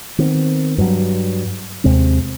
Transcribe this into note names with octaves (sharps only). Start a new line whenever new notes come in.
D#3 B3 C4
G2 F#3
D#2 C3 G#3 C4